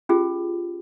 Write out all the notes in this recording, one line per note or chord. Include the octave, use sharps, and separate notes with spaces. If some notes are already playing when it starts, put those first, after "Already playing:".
C#4 F4 G4 G#4